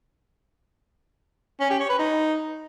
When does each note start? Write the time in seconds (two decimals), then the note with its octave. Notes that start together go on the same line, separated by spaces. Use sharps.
1.61 C#4
1.70 G4
1.80 C#5
1.90 B4
1.99 D#4